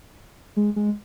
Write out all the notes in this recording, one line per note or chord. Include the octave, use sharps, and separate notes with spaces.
G#3
G#3